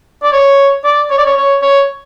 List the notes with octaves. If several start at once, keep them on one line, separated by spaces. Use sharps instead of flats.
D5
C#5
D5
C#5
D5
C#5
C#5
C#5